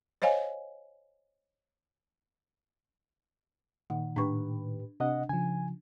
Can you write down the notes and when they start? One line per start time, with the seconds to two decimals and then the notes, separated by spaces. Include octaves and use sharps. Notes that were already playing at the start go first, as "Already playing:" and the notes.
0.22 C5 C#5 D#5 F5 G#5
3.90 A#2 D#3 F#5
4.16 A2 D4 G4 B4 C#6
5.00 C3 D4 D#5 F#5
5.29 C#3 F3 G#5